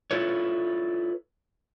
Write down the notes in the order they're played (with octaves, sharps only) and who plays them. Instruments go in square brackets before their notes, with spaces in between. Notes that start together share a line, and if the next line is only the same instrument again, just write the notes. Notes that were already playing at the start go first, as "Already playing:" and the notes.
[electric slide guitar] E4 F4 A4 B4 C#5